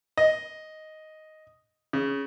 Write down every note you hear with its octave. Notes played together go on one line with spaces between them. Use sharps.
D#5
C#3